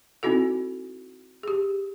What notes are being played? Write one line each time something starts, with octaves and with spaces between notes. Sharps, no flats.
C4 D#4 E4 F#4 A4
G4 G#4